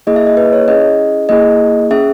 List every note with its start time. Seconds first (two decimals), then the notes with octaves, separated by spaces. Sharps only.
0.07 A#3 E4 G#4 D#5
0.16 E5
0.26 D#5
0.37 B4
0.53 C#5
0.68 C#4 E4 G#4 D#5
1.29 A#3 E4 G#4 D#5
1.91 C#4 G#4 E5